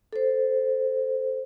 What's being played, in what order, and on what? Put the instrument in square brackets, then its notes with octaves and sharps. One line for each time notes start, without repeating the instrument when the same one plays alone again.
[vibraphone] A4 C5